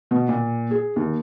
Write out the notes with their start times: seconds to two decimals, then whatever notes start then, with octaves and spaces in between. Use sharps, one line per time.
0.11 B2
0.29 A#2
0.71 G#4
0.96 D#2